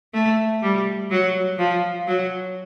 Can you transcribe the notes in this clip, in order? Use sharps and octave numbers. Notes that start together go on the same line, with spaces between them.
A3
G3
F#3
F3
F#3